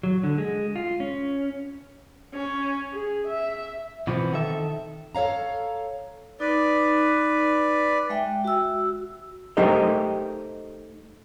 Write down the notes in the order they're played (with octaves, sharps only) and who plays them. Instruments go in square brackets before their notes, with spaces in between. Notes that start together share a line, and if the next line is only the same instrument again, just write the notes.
[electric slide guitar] F#3
D3
G#3
F4
C#4
[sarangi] C#4
G#4
E5
[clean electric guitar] B2 E3 F3 G3 B3 C4
D#3 A4 E5
[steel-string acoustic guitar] A4 C#5 F5 A#5
[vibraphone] D#4 [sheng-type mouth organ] B4 D5
[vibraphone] G#3 E5 G5
F#4 E6
[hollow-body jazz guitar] A3 D#4 G4 A#4 C5 D#5